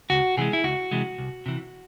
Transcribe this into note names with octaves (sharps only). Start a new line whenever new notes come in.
C#2 F#4
C3 E3 G#3 G#4
E4
C#2 F#4
C3 E3 G#3
C2
C3 E3